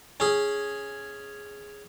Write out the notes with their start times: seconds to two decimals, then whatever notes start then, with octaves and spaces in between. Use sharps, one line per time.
0.20 C#4 G#4